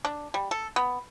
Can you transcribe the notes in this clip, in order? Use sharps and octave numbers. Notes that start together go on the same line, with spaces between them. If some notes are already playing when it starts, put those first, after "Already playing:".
D4
G3
A4
B3